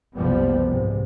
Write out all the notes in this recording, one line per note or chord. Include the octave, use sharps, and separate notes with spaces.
F#1 C2 F3 G3 B3
G#2 C3